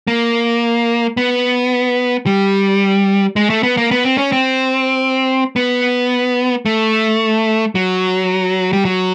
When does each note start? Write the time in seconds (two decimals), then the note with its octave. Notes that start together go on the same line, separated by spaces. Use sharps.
0.07 A#3
1.17 B3
2.26 G3
3.36 G#3
3.50 A3
3.63 B3
3.77 A#3
3.91 B3
4.05 C4
4.18 C#4
4.32 C4
5.56 B3
6.66 A3
7.75 F#3
8.73 G3
8.85 F#3